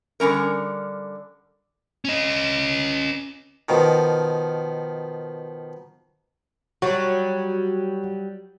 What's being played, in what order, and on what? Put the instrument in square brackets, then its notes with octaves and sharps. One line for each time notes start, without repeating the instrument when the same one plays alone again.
[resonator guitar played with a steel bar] D3 G3 C#4 A#4
[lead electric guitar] C#4 D#5
[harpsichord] B2 D#3 F3
[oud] F#3 G3 [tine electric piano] F#4